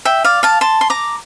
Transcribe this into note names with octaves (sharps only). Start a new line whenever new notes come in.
E5 G5
D5 F5
F5 A5
A5 C6
C6
A#5 D6